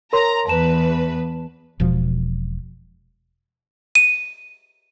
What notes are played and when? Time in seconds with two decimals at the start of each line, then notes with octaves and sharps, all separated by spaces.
0.13 A#4 C#5 A#5 C6
0.48 E2 B4 A5 E7
1.80 E1 B2 F3
3.95 D#7